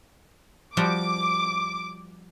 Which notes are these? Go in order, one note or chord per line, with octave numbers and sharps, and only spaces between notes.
F3 G3 F#4 D6